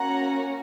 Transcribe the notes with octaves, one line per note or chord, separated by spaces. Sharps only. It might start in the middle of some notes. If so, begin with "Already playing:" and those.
Already playing: A#3 C#4 F#4 F#5 A#5